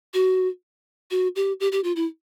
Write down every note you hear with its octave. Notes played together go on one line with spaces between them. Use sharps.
F#4
F#4
G4
G4
G4
F4
E4